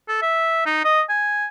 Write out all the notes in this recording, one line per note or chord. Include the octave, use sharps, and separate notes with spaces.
A4
E5
D#4
D#5
G#5